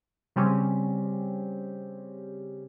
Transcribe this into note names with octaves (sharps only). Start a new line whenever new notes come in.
C#3 G3 C4 C#4 G4